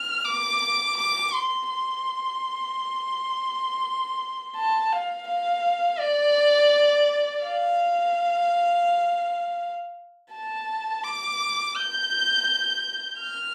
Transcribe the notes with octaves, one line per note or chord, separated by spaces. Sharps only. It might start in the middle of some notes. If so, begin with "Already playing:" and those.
Already playing: F6
D6
D6
C6
C6
A5
F5
F5
D5
F5
A5
D6
G6
F6